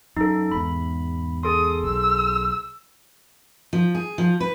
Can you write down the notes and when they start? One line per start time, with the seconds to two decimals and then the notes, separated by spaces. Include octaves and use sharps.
0.17 F#2 D#4 A4
0.52 E2 G#2 B5
1.43 G#4 A4 C6 D#6
1.83 B1 E6
3.73 F3
3.95 G#4
4.18 F3
4.40 B4